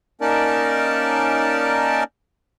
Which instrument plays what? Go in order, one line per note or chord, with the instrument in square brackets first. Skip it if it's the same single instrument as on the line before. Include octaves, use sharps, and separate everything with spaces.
[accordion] A#3 C#4 D#4 A#4 D5 A5